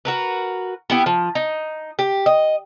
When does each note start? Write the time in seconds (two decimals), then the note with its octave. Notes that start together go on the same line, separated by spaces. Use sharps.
0.05 F#4 A#4 B4
0.90 B3 E4 G4
1.06 F3
1.35 D#4
1.99 G4
2.26 D#5